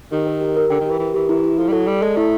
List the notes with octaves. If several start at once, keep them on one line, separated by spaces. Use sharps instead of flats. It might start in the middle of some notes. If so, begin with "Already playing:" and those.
D#3 G4
A#4
G4
A#4
D3 G5
D#3
E3 G4
E3 A#4
E3 G4
E3 E4
E4
F3 A4
G3
F#3 A4
G3 D5
G#3 A4
A3 E4